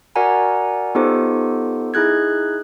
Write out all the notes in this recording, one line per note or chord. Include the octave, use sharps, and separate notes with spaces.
F#4 A#4 D5 F#5 G#5 A#5
B3 D#4 F4 G4 A4 C5
D#4 E4 G#4 F#6 G#6